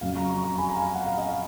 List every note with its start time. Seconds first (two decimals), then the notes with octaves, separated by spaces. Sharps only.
0.01 F2 C#3 F#3 F5
0.15 A#5 C#6
0.29 A#5 C#6
0.44 A#5 C#6
0.58 G#5 B5
0.69 A#5
0.76 F5 G#5
0.95 F#5
1.06 F5
1.18 D#5
1.30 F5